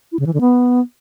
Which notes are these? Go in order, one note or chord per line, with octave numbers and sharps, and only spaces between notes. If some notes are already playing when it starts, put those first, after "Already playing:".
E4
C#3
E3
D3
B3